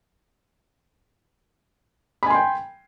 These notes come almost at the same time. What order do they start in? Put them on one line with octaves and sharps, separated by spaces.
B5 G#5 C6 G5